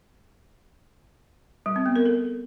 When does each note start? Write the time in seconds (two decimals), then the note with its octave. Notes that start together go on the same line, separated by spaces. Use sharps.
1.66 G3
1.76 C4
1.86 B3
1.96 A#4
2.05 A4